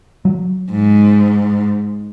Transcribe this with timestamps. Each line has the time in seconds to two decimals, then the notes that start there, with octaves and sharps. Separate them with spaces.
0.25 F#3
0.70 G#2